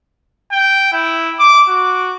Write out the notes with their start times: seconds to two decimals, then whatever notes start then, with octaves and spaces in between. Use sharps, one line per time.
0.52 G5
0.93 E4
1.39 D6
1.69 F#4